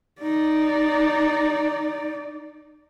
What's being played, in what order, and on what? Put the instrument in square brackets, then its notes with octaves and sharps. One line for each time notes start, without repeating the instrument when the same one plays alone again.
[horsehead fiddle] D#4 D5